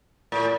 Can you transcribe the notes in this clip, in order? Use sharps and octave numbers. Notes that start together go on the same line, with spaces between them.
A2